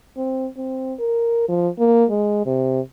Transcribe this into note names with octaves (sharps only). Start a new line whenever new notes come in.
C4
C4
A#4
F3
A#3
G#3
C3